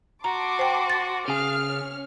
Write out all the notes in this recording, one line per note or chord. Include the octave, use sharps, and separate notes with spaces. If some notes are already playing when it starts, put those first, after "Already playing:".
F#4 A5 A#5 C6 D6
C5 G5
A6
C#3 G#4 F5 F6
C#4